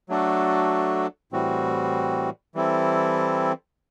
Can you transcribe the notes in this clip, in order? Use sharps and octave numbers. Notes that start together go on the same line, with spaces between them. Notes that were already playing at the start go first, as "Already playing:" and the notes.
F#3 A3 D4 F#4 A4
A2 E3 G3 C4 F#4
E3 G3 C4 E4 A4